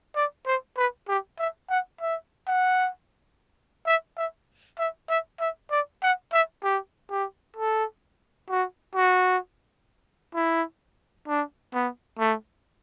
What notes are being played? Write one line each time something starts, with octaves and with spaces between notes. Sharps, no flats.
D5
C5
B4
G4
E5
F#5
E5
F#5
E5
E5
E5
E5
E5
D5
F#5
E5
G4
G4
A4
F#4
F#4
E4
D4
B3
A3